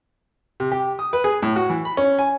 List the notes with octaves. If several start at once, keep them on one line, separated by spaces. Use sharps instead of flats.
C3
G4
D#6
B4
G#4
A2
F#4
E3
B5
C#4
G#5